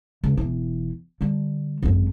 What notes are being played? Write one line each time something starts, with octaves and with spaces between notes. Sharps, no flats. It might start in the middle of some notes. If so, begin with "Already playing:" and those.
C#2
E1 E3
D3 G3
G#1 F#2